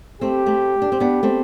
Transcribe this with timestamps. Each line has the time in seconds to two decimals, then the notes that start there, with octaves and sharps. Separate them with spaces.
0.21 A3 C4 G4
0.46 A3 C4
0.82 D4
0.92 C4
1.00 B3 D4
1.23 A3 C4